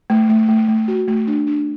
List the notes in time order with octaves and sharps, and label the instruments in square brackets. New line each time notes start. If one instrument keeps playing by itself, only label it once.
[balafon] A3
A3
A3
A3
F#4
A3
D4
D4